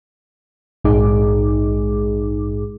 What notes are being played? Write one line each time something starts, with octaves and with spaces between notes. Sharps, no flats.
A#1 G#2 G#3 D#4 G#4 D6